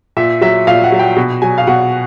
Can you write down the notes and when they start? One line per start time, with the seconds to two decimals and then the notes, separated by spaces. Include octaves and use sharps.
0.17 A#2 E5
0.41 F#3 E5
0.67 A#2 F5
0.84 F#5
0.92 F#3
0.99 G5
1.16 B2
1.42 F#3 G#5
1.58 F5
1.67 B2 F#5